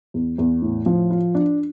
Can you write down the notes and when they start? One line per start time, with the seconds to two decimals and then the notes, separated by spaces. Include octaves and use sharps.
0.14 E2
0.38 E2
0.62 A2
0.86 F3
1.11 F4
1.35 D4